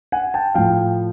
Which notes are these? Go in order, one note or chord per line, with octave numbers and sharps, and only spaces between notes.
F#5 G#5
G5 A5
A2 F3 F5 G5